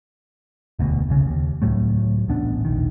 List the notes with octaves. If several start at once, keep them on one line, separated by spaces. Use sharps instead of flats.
E1 D2 B2
E1 C2 C#3
D#2
C#2 A2 F#3 A3
D#1 A1 B3 D4
E1 A#1 D#3